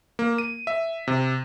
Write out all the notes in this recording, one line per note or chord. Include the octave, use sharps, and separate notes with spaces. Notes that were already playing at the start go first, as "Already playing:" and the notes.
A#3
D#7
E5
C3